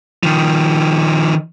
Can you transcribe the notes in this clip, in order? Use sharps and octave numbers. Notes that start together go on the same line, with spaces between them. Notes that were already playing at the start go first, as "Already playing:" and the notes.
D#3 F3